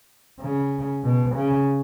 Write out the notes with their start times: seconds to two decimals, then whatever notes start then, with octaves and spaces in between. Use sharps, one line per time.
0.40 C#3
1.03 B2
1.35 C#3